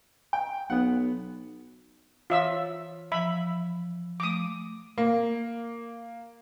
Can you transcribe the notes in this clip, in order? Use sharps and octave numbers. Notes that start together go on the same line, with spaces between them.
G5
B1 B3 F#5
E3 F4 C#5 E5 D#6 E6
F3 E5 B5
F3 A3 D6 D#6
A#3